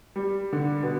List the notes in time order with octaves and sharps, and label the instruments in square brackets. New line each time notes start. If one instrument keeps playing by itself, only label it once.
[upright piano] G3
D3
B2